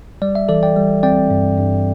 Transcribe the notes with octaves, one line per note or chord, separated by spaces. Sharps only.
G3 D5
E5
E3 A4 D5
D5 G5
G3
C4 D5 G5
G2
G2